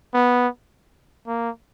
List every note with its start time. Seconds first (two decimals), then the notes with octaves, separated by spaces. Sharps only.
0.14 B3
1.27 A#3